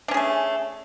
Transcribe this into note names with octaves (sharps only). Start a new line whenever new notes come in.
A3 C#4 D4 G#4